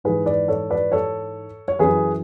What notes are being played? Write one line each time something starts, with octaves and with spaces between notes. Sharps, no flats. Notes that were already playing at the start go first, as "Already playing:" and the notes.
G#2 E3 G#4 B4
B4 D5
A4 C#5
B4 D5
A4 C#5
C#5
F#2 E3 G#4 B4